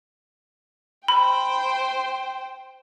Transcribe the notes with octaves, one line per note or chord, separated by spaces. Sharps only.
C5 G5 B5